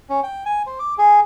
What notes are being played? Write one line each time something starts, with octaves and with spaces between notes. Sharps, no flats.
C#4
G5
G#5
C5
D6
G#4